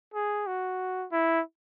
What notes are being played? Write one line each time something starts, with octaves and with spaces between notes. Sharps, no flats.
G#4
F#4
E4